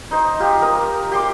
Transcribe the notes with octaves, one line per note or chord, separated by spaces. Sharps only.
D#4 C5
F4 G4
A#4 D#6
G4 C6 D6